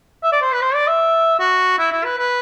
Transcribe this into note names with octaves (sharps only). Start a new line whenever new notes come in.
E5
D5
C5
B4
C5
D5
E5
F#4
E4
E4
B4
B4